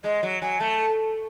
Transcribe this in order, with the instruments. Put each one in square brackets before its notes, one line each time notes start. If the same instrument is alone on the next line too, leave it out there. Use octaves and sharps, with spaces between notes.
[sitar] G#3 [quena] D#5
[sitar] F#3
[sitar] F#3 [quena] G#5
[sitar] A3 [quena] A5